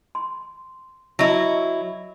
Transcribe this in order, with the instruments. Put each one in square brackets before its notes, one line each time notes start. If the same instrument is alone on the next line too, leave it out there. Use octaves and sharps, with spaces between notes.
[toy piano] C6
[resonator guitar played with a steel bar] F#3 E4 [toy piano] D#5